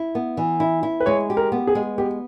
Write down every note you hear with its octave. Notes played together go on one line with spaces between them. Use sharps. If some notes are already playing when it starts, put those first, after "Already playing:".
Already playing: E4
B3
E3
E4
E4
B4
G#3 C#5
G4
A#4
B3
G#4
G#3
B3 G4